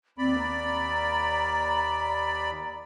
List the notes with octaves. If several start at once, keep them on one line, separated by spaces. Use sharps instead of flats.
D#2 C4 D5 B5
A#5